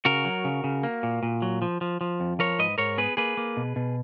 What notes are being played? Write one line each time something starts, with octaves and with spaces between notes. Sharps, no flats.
C#3 F#4 A#4
F#3
C#3
C#3
A#3
A#2
A#2
F#3
F3
F3
F3
F2
F3 A#4 C#5
G#2 B4 D#5
G#2 A#4 C#5
B3 G#4 B4
A#3 G#4 B4
A#3
B2
B2